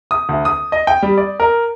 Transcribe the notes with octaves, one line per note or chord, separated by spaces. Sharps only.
D#6
D2
D#6
D#5
G5
G3
D5
A#4